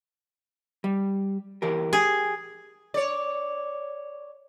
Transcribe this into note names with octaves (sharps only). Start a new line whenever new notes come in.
G3
E3 G4 A#4
G4 G#4
C#5 D5